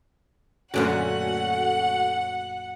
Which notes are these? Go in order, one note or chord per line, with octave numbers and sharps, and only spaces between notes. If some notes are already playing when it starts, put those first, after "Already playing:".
F#2 A#2 D3 A3 C#4 F#4 F#5